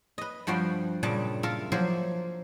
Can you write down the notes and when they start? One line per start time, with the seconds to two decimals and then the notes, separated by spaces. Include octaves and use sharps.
0.18 B4 D#5
0.47 G2 F3 G3 F#4 G5 C6
1.03 G2 A#2 C#3 G3 D4 A5
1.43 F4 A4 A#4 E5
1.72 F3 F#3 A#3 C5 E5